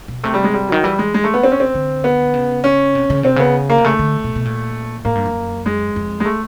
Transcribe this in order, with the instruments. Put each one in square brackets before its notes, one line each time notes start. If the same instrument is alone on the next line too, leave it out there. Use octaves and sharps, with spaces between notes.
[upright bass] B2
[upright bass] C3 [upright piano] A3
[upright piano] G3
G#3
G3
[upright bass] D#3 [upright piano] F#3
[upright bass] E3 [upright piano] G3
[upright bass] E3 [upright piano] G#3
[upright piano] G#3
A3
B3
C4
C#4
C4
[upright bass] D3
[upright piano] B3
[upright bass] C#3
[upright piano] C#4
[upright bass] C3
C#3
[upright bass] C3 [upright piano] C4
[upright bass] C#3 [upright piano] B3
[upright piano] A#3
[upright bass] C3
[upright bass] C#3 [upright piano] A3
[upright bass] D3
B2
B2
A#2
[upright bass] A2 [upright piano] A#3
[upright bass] G2
F#2
[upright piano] G#3
[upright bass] F2
[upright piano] G#3
A3